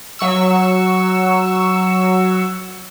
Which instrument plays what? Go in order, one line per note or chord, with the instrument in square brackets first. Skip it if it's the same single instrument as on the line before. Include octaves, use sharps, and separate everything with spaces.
[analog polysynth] F#3 C#6 E6